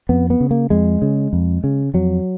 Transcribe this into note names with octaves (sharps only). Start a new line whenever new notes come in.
F2 B3
B3
C#3
A#3
F2 G#3
C#3
F2
C#3
F2 F#3